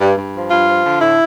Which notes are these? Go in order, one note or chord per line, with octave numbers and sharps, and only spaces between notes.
G2
G2
F3
G2 F4
F3
D3
A2 E4